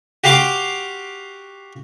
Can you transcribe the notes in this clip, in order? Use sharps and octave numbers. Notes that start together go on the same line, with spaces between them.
F#4 G4 F5 C6 D6